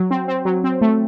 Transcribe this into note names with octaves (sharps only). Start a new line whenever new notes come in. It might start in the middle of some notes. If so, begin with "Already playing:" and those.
Already playing: F#3
C4
C4
F#3
C4
A3